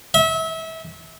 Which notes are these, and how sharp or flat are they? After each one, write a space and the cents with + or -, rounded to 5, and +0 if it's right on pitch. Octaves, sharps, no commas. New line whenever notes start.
E5 -30